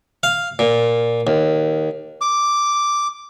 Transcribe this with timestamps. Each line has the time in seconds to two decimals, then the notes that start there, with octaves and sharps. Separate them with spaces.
0.23 F5
0.59 A#2
1.27 D#2
2.21 D6